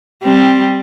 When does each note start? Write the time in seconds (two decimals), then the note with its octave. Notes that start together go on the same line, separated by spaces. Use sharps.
0.23 G3 C4